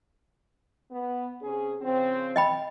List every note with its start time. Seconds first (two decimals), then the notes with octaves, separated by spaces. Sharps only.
0.91 B3
1.42 C3 C#4 G#4
1.82 C#3 F3 C4
2.36 D#5 G5 B5